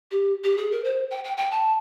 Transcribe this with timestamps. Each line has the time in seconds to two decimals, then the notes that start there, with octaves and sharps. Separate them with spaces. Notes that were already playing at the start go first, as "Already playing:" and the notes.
0.11 G4
0.44 G4
0.57 G#4
0.71 A#4
0.84 C5
1.11 G5
1.24 G5
1.37 G5
1.51 A5